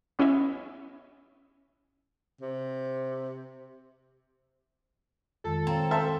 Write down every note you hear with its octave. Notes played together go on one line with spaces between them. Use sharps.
B3 C#4 E4 D#5 E5
C3
F2 D#3 G#3 A4
C4 C#5 F5 A#5
C5 E5 A5